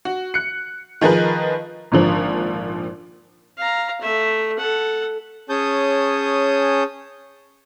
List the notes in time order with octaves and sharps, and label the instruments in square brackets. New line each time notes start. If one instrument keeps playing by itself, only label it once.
[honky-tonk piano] F#4
F#6 C#7
D#3 F3 G#4 A#4 B4
G#1 A#2 D3 F3
[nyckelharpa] F5 A#5
A3 E5
A4 F#5
[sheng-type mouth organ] C#4 G#4 C#5 A5 D#6 G6